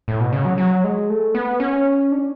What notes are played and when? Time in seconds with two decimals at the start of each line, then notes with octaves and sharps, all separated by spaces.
0.08 A2
0.20 B2
0.33 C#3
0.45 F#3
0.58 F#3
0.84 G#3
1.10 A3
1.35 B3
1.60 C#4
2.12 D4